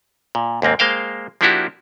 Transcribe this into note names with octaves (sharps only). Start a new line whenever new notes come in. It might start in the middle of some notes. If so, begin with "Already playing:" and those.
A#2
D#2 G#2 A#3 C4
G#3 A#3 C5 F5 G5
F3 A#3 D4 E4 F#4 G4